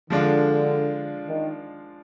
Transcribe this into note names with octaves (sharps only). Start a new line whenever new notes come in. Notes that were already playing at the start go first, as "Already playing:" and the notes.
D3 F3 G#3 D4 F4
D#3